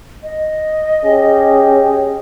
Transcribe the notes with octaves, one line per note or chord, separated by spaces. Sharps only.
D#5
C#4 G4 G#4